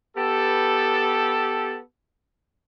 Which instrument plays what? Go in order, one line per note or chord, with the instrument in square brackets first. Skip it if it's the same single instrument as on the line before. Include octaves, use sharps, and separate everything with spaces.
[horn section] B3 G4 A4